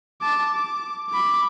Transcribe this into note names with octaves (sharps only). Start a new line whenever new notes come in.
A5 D6
D6
B5 D6